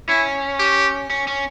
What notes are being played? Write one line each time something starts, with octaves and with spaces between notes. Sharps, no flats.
C#4 E4
G4
C#4
C#4